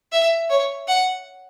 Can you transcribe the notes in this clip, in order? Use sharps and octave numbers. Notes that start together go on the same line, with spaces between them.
E5
C#5
F#5